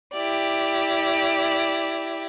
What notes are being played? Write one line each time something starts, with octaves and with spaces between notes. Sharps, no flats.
E4 G4 D5